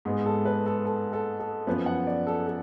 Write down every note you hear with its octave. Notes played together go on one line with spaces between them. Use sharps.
G#2 G#3 B3 G#4
A4
B4
A4
A4
A4
A4
F#2 F3 B3 B4
F#5
D5
A4
A4